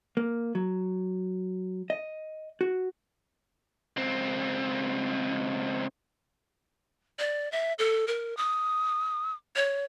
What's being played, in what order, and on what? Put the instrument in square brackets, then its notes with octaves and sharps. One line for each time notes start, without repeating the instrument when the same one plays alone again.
[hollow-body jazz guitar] A#3
F#3
D#5
F#4
[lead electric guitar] C#2 C4
[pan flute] D5
E5
A4
A#4
D#6
C#5